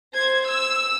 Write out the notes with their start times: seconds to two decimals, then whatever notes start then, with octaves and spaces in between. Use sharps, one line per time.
0.15 C5 G#6
0.48 E6